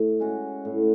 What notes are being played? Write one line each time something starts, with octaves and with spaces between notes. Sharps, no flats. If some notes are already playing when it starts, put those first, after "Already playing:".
Already playing: A2
G#3 C#4 F#4
A2